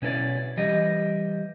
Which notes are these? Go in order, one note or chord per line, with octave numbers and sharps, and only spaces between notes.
B2 C#4 E4 A4 D5
E3 G3 D#5